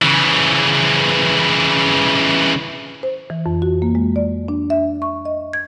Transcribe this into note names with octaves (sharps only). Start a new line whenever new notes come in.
C#3 E3
C5
E3
F2
F#4
A#3
G#3
D5
D4
E5
C#6
D#5
G#6